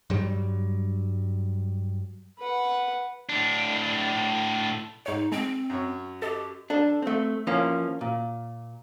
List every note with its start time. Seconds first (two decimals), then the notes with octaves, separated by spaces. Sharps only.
0.10 G2 F#3 G3
2.39 B4 F#5
3.29 A2 D4
5.06 G#2 D#4 C#5
5.32 G#3 C4
5.70 F#2 C#5
6.22 G4 A4 D#5
6.70 D4 A4
7.02 A3 C4
7.47 E3 F3 A#3 C#4
8.01 A#2